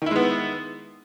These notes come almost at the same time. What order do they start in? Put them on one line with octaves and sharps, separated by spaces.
D#3 E4 G#3 B3